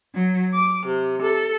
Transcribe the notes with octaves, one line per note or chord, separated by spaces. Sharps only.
F#3
D6
C3
A4